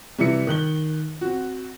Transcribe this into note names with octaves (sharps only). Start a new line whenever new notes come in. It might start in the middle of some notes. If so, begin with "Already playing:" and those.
C3 E3 G3 E4 E5 C#7
D#3 F#6 G7
C4 F#4